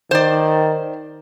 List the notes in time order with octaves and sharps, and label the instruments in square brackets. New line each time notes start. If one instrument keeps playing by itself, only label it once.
[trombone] D#3 [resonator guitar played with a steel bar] C5 D5